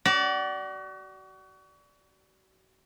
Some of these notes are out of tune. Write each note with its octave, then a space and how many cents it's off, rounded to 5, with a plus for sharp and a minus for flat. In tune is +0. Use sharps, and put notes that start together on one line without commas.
F#4 +35 D5 -5